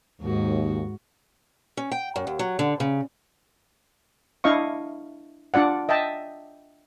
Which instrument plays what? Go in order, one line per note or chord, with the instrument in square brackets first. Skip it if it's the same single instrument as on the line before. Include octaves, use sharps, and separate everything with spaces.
[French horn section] D#2 [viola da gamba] G#2 F#4
[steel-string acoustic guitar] C#4
G5
F#2
D#2
F#3
D3
C#3
[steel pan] D4 E4 D#5 F5 C#6
D4 F4 D5 F#5
D#5 E5 G5 A5